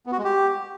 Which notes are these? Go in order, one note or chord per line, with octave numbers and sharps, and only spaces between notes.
B3
F#4
G#3
G4